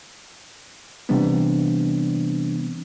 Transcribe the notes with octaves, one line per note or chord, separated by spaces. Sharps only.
C3 E3 G3 B3 C4 D4